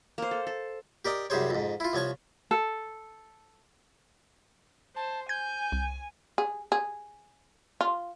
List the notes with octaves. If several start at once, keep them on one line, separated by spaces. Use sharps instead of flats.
A#3 C5
A4
A4
G4 A#4 D5 D#5
C2 F#2 G3 G#4 C5 C#5
F2 G#2
E4 F4
C2 F3 C#5 A5 C#6
A4
C5 A5
G#5 G6 G#6
C2
G#4
G#4
F4